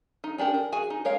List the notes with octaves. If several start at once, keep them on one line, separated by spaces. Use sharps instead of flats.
D#4
C#4 D4 G4 A#4
A#4
F#4 G#4 G#5
D#4
G#3 A#4 C#5 F5